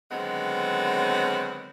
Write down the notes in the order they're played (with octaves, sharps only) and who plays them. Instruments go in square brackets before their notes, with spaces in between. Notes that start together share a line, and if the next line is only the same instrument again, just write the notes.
[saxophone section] D3 D#3 F#3 G#3 B3 C4